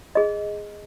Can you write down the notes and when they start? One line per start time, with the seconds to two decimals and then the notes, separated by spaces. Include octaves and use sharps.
0.15 G#4 D#5